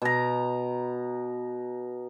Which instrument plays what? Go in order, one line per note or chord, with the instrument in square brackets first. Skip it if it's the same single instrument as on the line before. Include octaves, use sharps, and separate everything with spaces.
[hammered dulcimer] B2 A#5